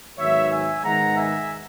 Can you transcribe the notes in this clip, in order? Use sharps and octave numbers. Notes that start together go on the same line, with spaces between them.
G#2 D#3 F#3 B3 C#5 E5
E5 G#5
G#2 D#3 G#3 B3 F#5 A#5
E5 G#5